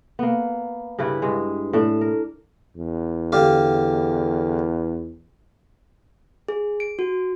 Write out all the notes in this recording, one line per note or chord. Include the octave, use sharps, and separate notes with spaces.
A#3 B3
G2 C#3 E4 B4
G2 G#3
A2 D4
A#4
E2
D3 G4 F5
G#4
D7
F#4